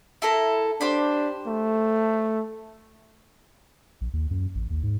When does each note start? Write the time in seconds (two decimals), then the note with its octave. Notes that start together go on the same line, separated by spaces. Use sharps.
0.22 E4 A4 A#4
0.81 D4 G4 C5 B5
1.47 A3
4.01 A#1
4.13 D#2
4.30 F#2
4.55 A1
4.70 D#2
4.83 G#2